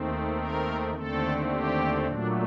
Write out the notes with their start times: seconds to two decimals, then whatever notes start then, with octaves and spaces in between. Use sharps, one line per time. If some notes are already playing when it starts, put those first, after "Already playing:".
Already playing: D#2 D#3 A3 C4
0.37 A#4
0.93 D#2 D3 A3 C4 A4
1.50 G4
2.07 A#2 F#3 A3 D4